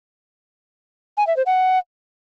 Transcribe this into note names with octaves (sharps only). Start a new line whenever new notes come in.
G#5
E5
C5
F#5